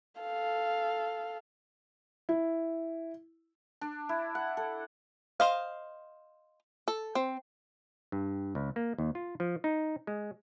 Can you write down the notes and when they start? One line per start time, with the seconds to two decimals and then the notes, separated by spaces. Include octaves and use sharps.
0.21 A4 F5
2.29 E4
3.81 D4
4.09 E4
4.35 F#5
4.57 A4
5.40 C5 D#5 F5
6.88 A4
7.15 C4
8.12 G2
8.55 C#2
8.76 A#3
8.98 D#2
9.15 F4
9.40 F3
9.64 D#4
10.07 G#3